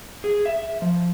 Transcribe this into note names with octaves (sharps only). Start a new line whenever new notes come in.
G#4
E5
F3